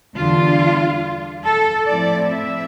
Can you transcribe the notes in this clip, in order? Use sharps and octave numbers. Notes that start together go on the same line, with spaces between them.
E2 D3 G3 D4 F4
A4
A2 F3 C4 E4 D5
E5